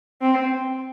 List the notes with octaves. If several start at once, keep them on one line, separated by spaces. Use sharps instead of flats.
C4